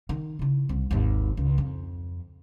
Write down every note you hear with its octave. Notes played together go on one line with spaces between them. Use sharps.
D#3
C#3 E4
C2
G#1 D#2
C#2
F2